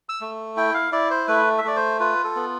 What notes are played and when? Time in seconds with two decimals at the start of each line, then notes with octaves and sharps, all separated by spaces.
0.09 E6
0.21 A3
0.57 E4 G5
0.74 F5
0.92 E4 D5
1.10 C5
1.28 A3 B4
1.58 E5
1.64 A3 D5
1.76 C5
2.00 F4 B4
2.24 A4
2.36 B3